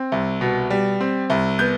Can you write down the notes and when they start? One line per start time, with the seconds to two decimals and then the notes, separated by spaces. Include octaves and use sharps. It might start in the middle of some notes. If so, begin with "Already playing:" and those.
Already playing: C4
0.12 C2
0.41 B2
0.70 G3
1.01 C4
1.30 C2
1.59 B3 G6